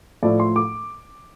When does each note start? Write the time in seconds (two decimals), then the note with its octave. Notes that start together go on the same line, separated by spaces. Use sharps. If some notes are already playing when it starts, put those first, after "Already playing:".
0.23 A2 F3 A3 D5
0.40 C6
0.56 D6